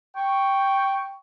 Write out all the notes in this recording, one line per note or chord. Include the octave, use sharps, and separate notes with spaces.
G5 C#6